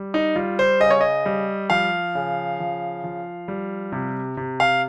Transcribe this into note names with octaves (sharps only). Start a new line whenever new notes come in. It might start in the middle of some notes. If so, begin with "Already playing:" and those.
Already playing: G3
D#4
G3 F4
C5
C#3 D#5
C#5
D#5
G3
F3 F5
C#3
F3
F3
G3
C3
C3
F5